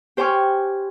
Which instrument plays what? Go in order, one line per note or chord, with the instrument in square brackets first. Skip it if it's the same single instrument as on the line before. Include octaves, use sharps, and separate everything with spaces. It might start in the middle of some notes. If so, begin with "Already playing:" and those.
[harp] G4 C5 G5 G#5 C#6 F6